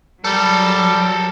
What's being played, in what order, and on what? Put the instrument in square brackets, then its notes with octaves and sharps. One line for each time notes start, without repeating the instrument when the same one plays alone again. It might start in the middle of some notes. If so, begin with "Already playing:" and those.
[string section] F#3 [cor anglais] G3 [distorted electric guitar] A4 A#4